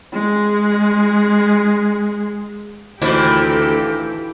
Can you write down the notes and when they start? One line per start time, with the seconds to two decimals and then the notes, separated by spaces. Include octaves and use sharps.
0.13 G#3 G#4
3.02 D2 A#2 D#3 E3 G4 A4 C5